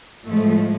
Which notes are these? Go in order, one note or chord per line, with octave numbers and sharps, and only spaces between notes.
A2 F3 G#3 A3